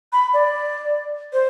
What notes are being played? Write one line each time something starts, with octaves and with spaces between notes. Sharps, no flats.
B5
D5
C5